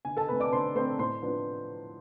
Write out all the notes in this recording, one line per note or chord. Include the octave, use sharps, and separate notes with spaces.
D3 G#5
A4 A5
A3 C4 B4 B5
D5 D6
D3 C5 C6
A3 C4 C5 C6
A2 C5 C6
F3 B3 D4